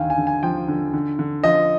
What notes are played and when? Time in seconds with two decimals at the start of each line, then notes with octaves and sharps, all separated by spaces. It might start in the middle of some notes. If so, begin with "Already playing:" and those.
Already playing: D#2 D3 F5 G5 G#5
0.10 G#5
0.18 D3
0.27 G#5
0.43 F3 G5
0.68 D3
0.94 D3
1.19 D3
1.44 F3 D#5